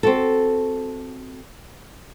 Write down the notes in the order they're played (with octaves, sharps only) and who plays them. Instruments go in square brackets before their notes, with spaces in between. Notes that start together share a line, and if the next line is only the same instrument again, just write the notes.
[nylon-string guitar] C4 F#4 A4